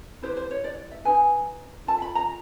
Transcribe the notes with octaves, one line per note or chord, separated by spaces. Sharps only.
E4 G4 B4 C5
C5
C#5
D5
E5
D#4 G#4 B4 G#5
F4 A4 A5
B5
A#5